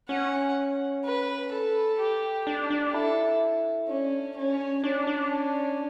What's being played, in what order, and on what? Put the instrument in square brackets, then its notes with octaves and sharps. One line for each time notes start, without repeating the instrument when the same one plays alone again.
[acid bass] C#4 [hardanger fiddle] F#5
[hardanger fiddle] B4
A4
G4
[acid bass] D4 [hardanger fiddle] G4
[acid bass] D4
[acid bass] E4 [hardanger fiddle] A4
[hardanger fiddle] C#4 [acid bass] D4
[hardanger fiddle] C#4
[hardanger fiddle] C#4 [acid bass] D4
[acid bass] D4